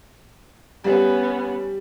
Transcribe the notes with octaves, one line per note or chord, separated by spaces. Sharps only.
G3 B3 C#4